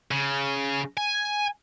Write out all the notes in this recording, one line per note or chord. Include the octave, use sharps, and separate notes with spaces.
C#3
G#5